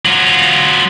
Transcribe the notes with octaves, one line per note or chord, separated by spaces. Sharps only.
F#3 F4